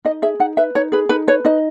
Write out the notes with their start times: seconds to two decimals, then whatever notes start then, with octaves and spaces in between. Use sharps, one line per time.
0.05 D#4 D#5
0.22 G#4 E5
0.40 D#4 F#5
0.57 B4 E5
0.75 D#4 C#5
0.92 G#4 B4
1.09 D#4 B4
1.28 B4 C#5
1.45 D#4 D#5